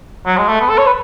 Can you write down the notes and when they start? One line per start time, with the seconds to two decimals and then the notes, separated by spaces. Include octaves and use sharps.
0.26 F#3
0.38 G#3
0.49 A3
0.61 B3
0.69 A4
0.78 C#5
0.86 B4